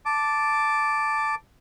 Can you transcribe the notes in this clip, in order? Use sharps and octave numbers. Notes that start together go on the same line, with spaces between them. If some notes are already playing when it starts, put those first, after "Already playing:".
A5 D6